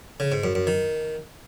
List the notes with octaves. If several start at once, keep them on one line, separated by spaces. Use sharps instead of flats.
C#3
G#2
F#2
F#2
D#3